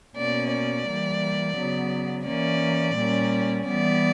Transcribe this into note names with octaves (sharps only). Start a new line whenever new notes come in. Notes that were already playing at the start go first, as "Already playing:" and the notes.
B2 A#3 C#4 D5
D5
E3 G3 A#3
C#3 F#3 B3
E3 A#3 C#4 D5
A#2 G3 A#3 C#4
E3 G3 B3 D5